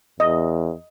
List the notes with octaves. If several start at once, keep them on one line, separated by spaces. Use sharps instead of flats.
E2 D#5